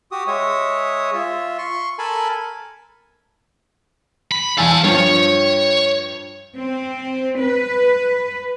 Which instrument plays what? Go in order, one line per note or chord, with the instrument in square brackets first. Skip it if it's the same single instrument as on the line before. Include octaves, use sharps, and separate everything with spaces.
[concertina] F#4 G4 D#6
G#3 C#5 E5 D#6
F4 E5
C6 C#6
A4 A#4 G#5 A5 B5
[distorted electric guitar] B5
[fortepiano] E2 G#5 E6 [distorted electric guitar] F5 A5
[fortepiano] G2 F3 [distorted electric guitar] C#5
[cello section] C4
B4